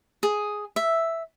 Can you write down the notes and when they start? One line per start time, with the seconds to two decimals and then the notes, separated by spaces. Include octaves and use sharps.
0.23 G#4
0.76 E5